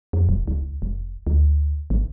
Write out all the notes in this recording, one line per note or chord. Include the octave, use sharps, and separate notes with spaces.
F2
E1
C#2
F1
D2
G#1